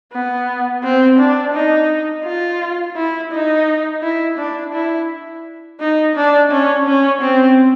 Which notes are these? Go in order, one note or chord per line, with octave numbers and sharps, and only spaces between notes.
B3
C4
D4
D#4
F4
E4
D#4
E4
D4
E4
D#4
D4
C#4
C#4
C4